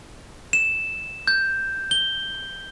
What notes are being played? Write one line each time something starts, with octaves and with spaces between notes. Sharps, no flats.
E7
G6
G7